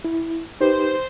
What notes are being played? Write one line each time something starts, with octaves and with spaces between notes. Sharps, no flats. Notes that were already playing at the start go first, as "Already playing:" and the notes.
E4
D#4 G4 B4 C5